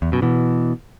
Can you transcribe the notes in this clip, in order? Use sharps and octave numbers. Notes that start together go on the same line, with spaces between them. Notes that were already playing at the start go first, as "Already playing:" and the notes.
E2
F#2 B2
B2 E3